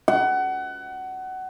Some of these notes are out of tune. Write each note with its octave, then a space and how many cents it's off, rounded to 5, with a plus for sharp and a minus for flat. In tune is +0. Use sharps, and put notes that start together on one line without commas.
F#5 +25